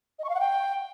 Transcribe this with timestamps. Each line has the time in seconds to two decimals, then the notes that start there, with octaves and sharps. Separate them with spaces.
0.19 D#5
0.24 C#6
0.29 F5
0.35 F#5
0.40 G5